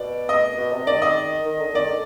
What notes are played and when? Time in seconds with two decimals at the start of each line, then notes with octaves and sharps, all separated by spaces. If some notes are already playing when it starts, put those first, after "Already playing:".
Already playing: B2 D5
0.29 D#5
0.57 B2
0.72 C3
0.87 D#3 D5
1.02 D#5
1.46 D#3
1.60 D3
1.74 D#3 D5
1.88 D3